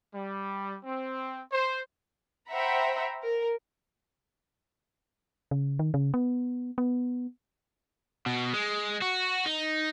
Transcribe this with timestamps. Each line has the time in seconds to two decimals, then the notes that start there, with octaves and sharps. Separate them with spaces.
0.14 G3
0.83 C4
1.50 C5
2.50 C5 E5 F#5 G5 A#5 B5
3.23 A#4
5.51 C#3
5.79 D#3
5.94 C#3
6.14 B3
6.78 B3
8.26 B2
8.53 G#3
9.02 F#4
9.46 D#4